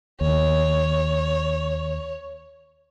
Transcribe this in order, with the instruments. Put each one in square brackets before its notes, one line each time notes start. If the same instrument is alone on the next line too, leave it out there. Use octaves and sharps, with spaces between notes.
[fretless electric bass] D#2 [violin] C#5